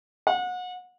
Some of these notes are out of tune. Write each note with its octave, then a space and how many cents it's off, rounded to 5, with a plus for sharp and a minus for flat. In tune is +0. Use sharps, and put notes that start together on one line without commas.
F#5 -30